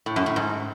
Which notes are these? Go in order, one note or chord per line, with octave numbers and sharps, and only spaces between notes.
A2
F#2
A2
G#2